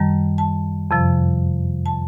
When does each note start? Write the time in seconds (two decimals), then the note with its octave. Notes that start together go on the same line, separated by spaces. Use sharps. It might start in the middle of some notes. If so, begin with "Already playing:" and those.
Already playing: F#2 D#3 G3 A5
0.38 A5
0.91 F2 C3 F3
1.86 A5